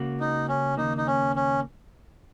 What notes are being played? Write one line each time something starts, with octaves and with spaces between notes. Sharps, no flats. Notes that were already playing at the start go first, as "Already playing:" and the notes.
Already playing: C#2 C#3 A#3 F#4
D#4
C#4
D#2 C#3 A#3 D#4
D#4
C#4
C#4